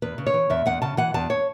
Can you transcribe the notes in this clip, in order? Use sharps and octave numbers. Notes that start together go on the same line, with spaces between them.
E2 B4
C#3
C#5
E3
E2 E5
E2 F#5
C#3 A5
E3 F#5
E2 A5
C#5